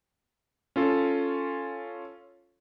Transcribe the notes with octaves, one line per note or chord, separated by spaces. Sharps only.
C#4 F4 A4